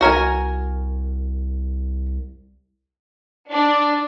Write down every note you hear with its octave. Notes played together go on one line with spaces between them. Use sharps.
C2 F#4 A#4 G#5
D4